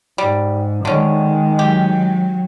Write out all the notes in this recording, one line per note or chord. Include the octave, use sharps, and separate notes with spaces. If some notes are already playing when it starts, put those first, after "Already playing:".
G#2 G3
D3 D#3 G#3 C#4
F#3 G4